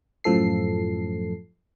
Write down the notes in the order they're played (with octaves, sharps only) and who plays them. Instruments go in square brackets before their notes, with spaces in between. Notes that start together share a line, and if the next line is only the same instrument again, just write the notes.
[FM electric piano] F#2 A2 F3 A4 C7